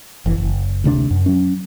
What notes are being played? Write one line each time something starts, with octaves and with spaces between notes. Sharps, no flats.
F#1 E3
F#1
D2 C3 G3 D4
F#2
F#3 C#4